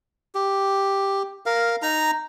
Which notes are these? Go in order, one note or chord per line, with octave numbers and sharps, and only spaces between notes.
G4
A#4 F5
D#4 A#5